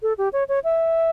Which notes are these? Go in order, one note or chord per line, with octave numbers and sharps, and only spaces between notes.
A4
G4
C#5
C#5
E5